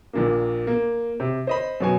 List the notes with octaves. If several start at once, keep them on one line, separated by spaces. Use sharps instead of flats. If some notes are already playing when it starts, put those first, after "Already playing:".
A#1 A#2 A#3
A#3
C3
C5 D#5 B5
F#2 B2 G#5